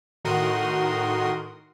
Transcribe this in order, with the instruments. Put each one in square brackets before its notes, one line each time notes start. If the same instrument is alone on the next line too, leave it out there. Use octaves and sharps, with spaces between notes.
[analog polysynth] A2 D#3 F#4 A#4 C6 D#6